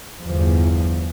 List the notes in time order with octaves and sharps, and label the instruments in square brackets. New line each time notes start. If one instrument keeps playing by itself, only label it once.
[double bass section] G1 E2 F3